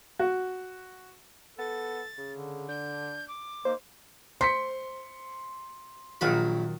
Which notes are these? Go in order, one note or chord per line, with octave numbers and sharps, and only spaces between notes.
F#4
B3 A4 A6
C#3
D3
D4 G6
D6
A#3 D#4 C5
C5 C6 B6 C#7
A#1 D#3 F#3 F4 B5